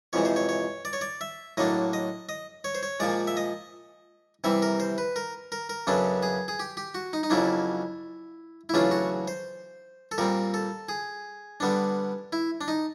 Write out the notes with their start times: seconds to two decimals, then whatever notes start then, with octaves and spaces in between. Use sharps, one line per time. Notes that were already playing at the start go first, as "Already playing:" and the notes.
0.13 F2 C3 E3 G#3 C#5
0.25 C5
0.36 C#5
0.49 C#5
0.85 D5
0.93 C#5
1.01 D5
1.21 E5
1.57 A2 F#3 A#3 D4 D#5
1.93 D#5
2.29 D#5
2.64 C#5
2.75 C5
2.83 C#5
3.00 A#2 F3 G#3 D5
3.27 E5
3.37 D#5
4.44 C3 E3 G3 C4 E5
4.62 A#4
4.80 C5
4.98 B4
5.16 A#4
5.52 A#4
5.69 A#4
5.87 F#2 C#3 F#3 B3 D4 A4
6.23 G#4
6.48 G#4
6.60 G4
6.77 G4
6.95 F#4
7.13 D#4
7.23 D#4
7.30 F2 C#3 F#3 A#3 D4 E4
8.69 E4
8.74 E2 C#3 F#3 A3 D4 F4
8.91 F#4
9.28 C5
10.12 A4
10.18 A#2 G3 C4 A#4
10.54 A4
10.89 G#4
11.60 D3 G3 B3 D4
12.33 E4
12.61 D4
12.68 D#4